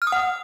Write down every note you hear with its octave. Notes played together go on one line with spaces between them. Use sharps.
F6
D#6
F#5